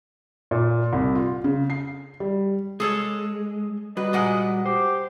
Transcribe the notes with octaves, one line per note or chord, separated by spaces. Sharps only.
A#2
C2
F4
C#3
C7
G3
G#3 G#4 A4 C#5
G3 F#4 B4 D#5
A#2 G#3 F#5
G4 C5